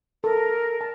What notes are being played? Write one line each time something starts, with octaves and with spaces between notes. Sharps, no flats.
A4 A#4
A5